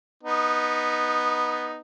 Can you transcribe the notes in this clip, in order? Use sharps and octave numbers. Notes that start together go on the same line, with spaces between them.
B3 D#4